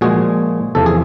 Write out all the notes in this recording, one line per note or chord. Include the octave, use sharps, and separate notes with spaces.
A#2 F3 G#3 F#4 G#4
E2 C3 F3 A4
G#4